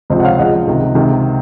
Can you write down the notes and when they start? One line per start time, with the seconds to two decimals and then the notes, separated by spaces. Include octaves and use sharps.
0.10 C#2 C3 F3 C5 D#5
0.20 F#5
0.24 C#5 F5
0.38 C#2 C#3 F3 D#5 F#5
0.67 C#2 C3 D#3
0.95 C#2 C3 D#3